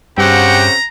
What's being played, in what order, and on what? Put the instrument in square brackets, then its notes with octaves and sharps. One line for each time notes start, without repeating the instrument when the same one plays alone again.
[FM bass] G2 [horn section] C#3 C4 F#4 [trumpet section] G4 F#5 [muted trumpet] A#5